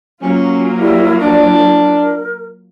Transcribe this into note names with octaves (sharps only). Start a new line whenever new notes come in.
F#3 A#3 C#4 F4
G3 E4
D4 D5
A#4